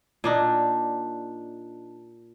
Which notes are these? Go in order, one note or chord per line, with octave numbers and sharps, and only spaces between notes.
A#2 D4 D#4